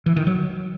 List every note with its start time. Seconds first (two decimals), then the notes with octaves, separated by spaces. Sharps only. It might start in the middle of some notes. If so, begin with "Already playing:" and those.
0.06 E3
0.16 D#3
0.27 F#3